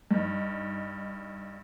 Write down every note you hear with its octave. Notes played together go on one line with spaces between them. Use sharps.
G2 D#4